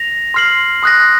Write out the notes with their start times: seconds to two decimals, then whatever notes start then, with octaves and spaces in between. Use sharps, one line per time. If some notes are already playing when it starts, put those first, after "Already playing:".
Already playing: A#6 F7
0.34 C6 F6 C7 F#7
0.83 C6 D#6 F#6 A#6